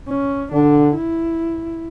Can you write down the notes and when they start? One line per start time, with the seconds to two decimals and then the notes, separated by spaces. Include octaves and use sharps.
0.09 C#4
0.52 D3 D4
0.95 E4